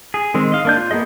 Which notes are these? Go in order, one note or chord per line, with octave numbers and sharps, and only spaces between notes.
G#4
D#3 G#3 C4
D#5 F5
A#3 D4 G6
F4
A#3 B3 G#4 D#5